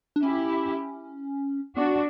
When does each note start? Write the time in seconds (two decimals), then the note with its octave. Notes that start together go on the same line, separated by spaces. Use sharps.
0.16 D4
0.23 C#4 E4 G4
1.76 B3 D4 F#4